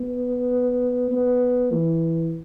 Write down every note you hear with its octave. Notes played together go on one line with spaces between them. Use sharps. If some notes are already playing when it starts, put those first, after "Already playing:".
Already playing: B3
B3
E3